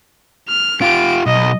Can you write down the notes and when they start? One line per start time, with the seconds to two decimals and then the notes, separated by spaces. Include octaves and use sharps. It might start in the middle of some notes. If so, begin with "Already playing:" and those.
0.48 F6
0.82 F4 G4 D7
1.26 B1 D#5